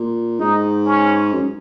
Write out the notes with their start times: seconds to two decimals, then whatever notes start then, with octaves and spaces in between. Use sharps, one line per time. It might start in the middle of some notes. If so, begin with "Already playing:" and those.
Already playing: A#2
0.40 G#2 D#4
0.86 C#4
1.32 F#2